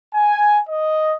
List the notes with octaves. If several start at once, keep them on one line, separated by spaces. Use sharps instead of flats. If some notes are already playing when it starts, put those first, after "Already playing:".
G#5
D#5